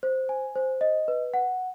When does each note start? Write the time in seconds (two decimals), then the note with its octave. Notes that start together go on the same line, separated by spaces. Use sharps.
0.03 C5
0.29 G#5
0.56 C5
0.81 D#5
1.08 B4
1.34 F#5